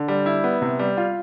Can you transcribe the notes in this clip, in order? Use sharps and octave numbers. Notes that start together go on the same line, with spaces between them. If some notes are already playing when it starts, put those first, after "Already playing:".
Already playing: D3
G3
E4
B3
C3
G3
F4